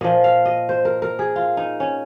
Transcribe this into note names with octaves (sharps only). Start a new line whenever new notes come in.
A#2 F3 D#5
F5
D#5
C5
A#4
A#4
G#4
F4
D#4
C#4